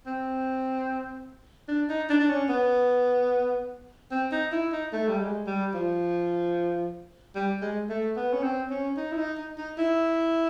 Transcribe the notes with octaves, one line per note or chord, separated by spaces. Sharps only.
C4
D4
D#4
D4
D4
C#4
B3
C4
D#4
E4
D#4
A3
G3
G#3
G3
F3
G3
G#3
A3
B3
C#4
C4
C#4
D#4
E4
D#4
D#4
D#4
E4